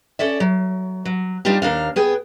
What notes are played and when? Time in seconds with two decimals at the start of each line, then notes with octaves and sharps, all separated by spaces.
0.19 C#4 A4 D5 E5
0.40 F#3
1.05 F#3
1.45 G3 D4 D#4 F4 G4
1.62 D#2 A#3 D4 F5
1.96 B3 G#4 G5